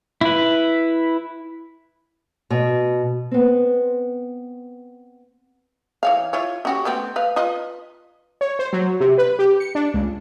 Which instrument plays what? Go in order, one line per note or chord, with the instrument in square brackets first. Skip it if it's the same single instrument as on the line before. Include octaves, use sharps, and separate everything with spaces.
[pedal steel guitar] E4 B4
[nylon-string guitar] B2
B3 C4
[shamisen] E3 C#5 F5
E4 F4 C#5
C#4 F#4 G4
A3 B3 C4
B4 F5
F4 B4 D#5
[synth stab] C#5
C5
F#3
C3
B4
G4
C#7
D4
C#2